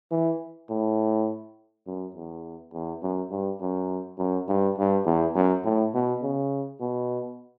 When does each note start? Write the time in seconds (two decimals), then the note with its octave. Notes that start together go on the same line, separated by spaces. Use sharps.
0.11 E3
0.70 A2
1.87 F#2
2.15 E2
2.73 E2
3.02 F#2
3.31 G2
3.61 F#2
4.18 F#2
4.48 G2
4.78 G2
5.06 E2
5.35 F#2
5.64 A2
5.94 B2
6.22 C#3
6.80 B2